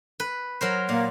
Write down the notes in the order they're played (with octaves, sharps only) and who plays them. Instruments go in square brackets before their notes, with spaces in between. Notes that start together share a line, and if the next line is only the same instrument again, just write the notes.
[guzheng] B4
F#3 A#4 C5
[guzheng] A#2 [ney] A#3